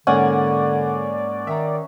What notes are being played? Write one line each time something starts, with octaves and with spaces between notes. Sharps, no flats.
G#2 D3 A#3 C#4 D5 F#5 G#5
D#3 E5 A#5